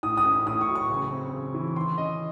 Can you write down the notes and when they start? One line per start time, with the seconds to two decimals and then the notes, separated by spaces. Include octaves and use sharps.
0.03 A2 D#6
0.17 D#6
0.25 C#4
0.46 A2 D#6
0.61 C#6
0.68 F#3
0.75 C#6
0.89 C#3
1.11 C4
1.33 C#3
1.54 E3
1.76 D#3 C6
1.98 C#4 D#5